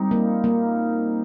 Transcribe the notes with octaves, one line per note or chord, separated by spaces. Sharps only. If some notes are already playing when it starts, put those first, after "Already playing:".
Already playing: G3 C4 D#4
A#3
A#3